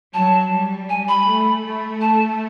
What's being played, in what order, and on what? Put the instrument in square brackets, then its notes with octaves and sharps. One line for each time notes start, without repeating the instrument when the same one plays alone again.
[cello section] F#3 [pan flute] A5
[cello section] G3
[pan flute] G#5
B5
[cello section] A3
A3
[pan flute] A5